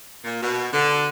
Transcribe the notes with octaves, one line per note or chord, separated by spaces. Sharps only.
A#2
B2
D3